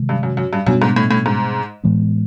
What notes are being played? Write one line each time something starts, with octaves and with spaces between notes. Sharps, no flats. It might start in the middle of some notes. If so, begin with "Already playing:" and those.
Already playing: C3 D#3 G#3
G2
F#2
F#2
G2
F#2 B2 G3 B3 D4
G#2
A2
A2
G#2
A2 E3 G#3 B3